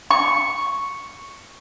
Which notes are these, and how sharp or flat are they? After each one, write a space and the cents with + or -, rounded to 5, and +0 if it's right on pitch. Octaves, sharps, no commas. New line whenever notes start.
C#6 +0